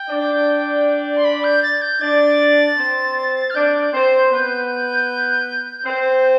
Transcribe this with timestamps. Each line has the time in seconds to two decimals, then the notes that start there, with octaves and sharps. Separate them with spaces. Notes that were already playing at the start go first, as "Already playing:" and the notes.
Already playing: G5
0.09 D4 D5
1.16 C6
1.24 B5
1.44 G6
1.63 A6
1.81 G6
2.01 D4 D5 A6
2.77 C4 C5
3.50 F6
3.54 D4 D5 G6
3.93 C4 C5
4.31 B3 B4
5.85 C4 C5